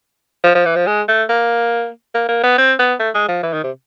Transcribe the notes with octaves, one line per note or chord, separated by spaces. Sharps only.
F3
F3
E3
F3
G#3
A3
A#3
A#3
A#3
B3
C4
B3
A3
G#3
F3
E3
D#3
C3